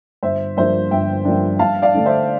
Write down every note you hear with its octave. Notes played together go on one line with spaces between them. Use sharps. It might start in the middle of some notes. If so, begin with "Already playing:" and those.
G1 C5 E5
G2 F3 A#3 D4 C5 E5
G1 E5 G5
G2 F3 A#3 D4
G2 F5 A5
D5 F5
D3 A3 D4
C5 E5